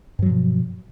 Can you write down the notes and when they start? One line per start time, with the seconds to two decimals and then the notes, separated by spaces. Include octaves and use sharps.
0.19 G2
0.22 F#3
0.26 F3
0.30 B2